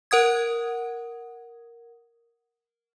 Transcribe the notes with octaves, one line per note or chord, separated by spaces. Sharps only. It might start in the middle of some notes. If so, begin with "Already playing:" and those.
A#4 F#5 D#6 G#6